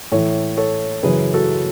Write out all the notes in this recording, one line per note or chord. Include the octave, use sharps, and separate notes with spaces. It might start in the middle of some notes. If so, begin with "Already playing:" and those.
A2 E3 A4 C#5
A4 C#5
F#2 C#3 E3 G#4 B4
F#4 A4